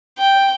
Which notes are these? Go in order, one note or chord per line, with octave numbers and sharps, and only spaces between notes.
G5